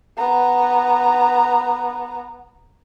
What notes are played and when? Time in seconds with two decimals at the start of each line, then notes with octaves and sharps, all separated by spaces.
0.18 B3 A#5